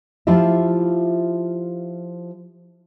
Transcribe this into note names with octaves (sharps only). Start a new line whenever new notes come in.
F3 E4 F4 G4 E5